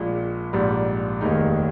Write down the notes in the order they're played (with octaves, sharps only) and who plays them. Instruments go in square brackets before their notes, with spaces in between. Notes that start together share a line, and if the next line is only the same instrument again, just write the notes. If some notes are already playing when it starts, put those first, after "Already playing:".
Already playing: [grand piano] A#1 A#2 G#3
A#1 G#2 G3
F1 D#2 D#3 G#3 D#4